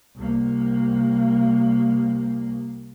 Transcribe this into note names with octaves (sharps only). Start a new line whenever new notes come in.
C2 A#3